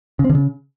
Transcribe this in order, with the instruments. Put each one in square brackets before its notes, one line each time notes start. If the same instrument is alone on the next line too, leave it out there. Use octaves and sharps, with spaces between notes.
[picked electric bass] C#3
C4
D3
C#3